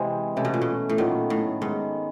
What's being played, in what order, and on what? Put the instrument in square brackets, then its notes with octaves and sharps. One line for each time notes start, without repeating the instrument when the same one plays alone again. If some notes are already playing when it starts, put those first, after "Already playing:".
Already playing: [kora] C3 [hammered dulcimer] E3 G#3 C4
[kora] C3 [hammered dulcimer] E3 A3 C#4
[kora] B2
A#2
B2
A2
[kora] A#2 [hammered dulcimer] D#3 F#3 B3
[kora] A2
[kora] G#2 [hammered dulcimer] D#3 G#3 B3